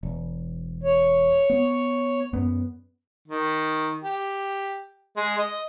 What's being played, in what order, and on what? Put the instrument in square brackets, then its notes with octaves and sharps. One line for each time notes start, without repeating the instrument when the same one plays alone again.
[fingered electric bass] E1
[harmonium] C#5
[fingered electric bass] B3
F#2 B3
[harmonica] D#3
G4
G#3
D#5